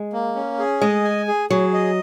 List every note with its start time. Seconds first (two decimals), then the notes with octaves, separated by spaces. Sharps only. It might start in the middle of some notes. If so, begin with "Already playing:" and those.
Already playing: G#3
0.13 A#3
0.35 C#4
0.59 G#4
0.81 G#3 D#5
1.04 G#5
1.28 G#4
1.50 F#3 G#4
1.74 D#5